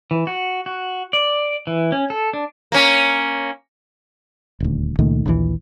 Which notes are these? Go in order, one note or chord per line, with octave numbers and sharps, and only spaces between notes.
E3
F#4
F#4
D5
E3
C#4
A4
D4
A#3 C#4
D#1 D2
C#2 A#2 D#3 A3
A#1 D#2 D#3 E3